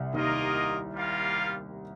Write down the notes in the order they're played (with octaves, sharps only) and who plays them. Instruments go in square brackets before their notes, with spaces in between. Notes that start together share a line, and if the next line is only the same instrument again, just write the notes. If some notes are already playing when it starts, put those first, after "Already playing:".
Already playing: [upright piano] C2 C3
[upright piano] D#2 D#3 [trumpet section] A#3 F4 A#4 D#5
[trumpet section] G3 A#3 F4 A#4 F5